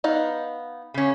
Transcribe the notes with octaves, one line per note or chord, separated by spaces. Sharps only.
B3 D#4 F5
C#3 C#4